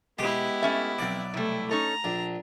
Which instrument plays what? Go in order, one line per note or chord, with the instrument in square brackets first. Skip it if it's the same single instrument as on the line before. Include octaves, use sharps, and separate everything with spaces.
[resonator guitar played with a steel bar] B2 [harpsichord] G#3 G4 [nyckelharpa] B3 E4
[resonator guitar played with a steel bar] A3 C#4 E5
[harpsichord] B1 D5 [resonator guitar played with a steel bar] F3 C4
[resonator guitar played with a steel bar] C3 G3 [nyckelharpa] A3 E4
[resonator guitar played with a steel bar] C#4 D#4 A4 [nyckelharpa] A#5
[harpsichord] A#1 [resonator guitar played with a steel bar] D4